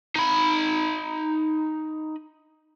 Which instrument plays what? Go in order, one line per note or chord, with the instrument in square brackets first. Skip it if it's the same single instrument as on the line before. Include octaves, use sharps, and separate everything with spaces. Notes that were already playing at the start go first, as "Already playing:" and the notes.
[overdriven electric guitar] D#4 B5